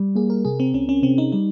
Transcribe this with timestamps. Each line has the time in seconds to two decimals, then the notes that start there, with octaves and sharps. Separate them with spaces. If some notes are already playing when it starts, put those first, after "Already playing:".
Already playing: G3
0.15 A#3 G#4
0.30 A#4
0.45 C3 G#4
0.60 C4
0.74 C#2 C#4
0.89 C#4
1.03 C3 C4
1.18 D#4
1.32 G3 D#4